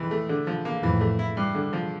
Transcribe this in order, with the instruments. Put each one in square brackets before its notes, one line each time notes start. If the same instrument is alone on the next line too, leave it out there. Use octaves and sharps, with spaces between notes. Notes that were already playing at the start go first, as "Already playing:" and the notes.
Already playing: [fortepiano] F2 E3
A3
D3
F3
A#3
[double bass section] F2 A2 [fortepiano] E3
[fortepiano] A3
E4
G2
D3
F3